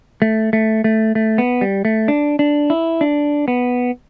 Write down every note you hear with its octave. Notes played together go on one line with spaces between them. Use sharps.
A3
A3
A3
A3
B3
G3
A3
D4
D4
E4
D4
B3